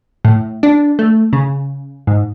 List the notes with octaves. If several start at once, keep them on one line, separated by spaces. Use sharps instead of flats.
A2
D4
A3
C#3
G#2